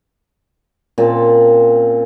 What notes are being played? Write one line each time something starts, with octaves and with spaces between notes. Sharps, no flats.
A#2 C4 C#4 A5